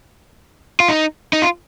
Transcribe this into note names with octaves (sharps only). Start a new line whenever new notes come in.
F4
D#4
D#4
F4